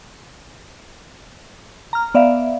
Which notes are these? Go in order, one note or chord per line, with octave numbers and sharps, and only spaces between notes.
A#5 F6
B3 D5 E5 F5